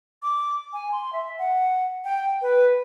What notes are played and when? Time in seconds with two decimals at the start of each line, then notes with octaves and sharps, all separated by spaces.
0.22 D6
0.73 G#5
0.92 C6
1.13 E5
1.39 F#5
2.04 G5
2.42 B4